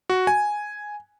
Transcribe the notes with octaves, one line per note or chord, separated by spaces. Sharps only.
F#4
G#5